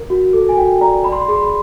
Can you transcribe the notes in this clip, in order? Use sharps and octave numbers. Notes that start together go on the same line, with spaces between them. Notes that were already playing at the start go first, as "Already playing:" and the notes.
Already playing: A#4
F#4
A4
G#5
F#4 G5
D5 A#5
D5 B5
C6
B5
G#4 C6
B5
C6